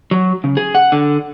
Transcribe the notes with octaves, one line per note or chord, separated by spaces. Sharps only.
F#3
C#3
G#4
F#5
D3